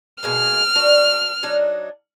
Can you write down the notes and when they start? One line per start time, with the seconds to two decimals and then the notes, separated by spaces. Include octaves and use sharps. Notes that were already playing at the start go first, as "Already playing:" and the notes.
0.23 B2 G#3 A#3 F6
0.75 D4 F#4
1.43 F#3 D4 D#4